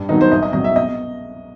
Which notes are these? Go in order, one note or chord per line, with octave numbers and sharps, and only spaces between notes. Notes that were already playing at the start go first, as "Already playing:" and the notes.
Already playing: G2
D#3 F#3 B3 D#4
C5
C2 D#5
D#5
B2 F#3 D#5
E5
B2 D#5